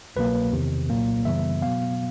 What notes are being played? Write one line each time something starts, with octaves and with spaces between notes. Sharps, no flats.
C2 B2 F#3 A#3 B4
E2 C3 D#3
C2 A#2 F#3 A#3
F#2 C#3 E3 G3 B3 E5
B2 F#3 B3 F5